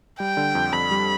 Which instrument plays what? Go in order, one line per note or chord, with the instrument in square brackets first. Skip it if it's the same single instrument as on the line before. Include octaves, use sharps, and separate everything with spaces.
[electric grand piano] G3 [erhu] G5
[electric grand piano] D3
F2
[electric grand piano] F2 [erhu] B5
[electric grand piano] G3